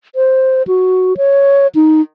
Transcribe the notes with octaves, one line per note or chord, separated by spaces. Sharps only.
C5
F#4
C#5
D#4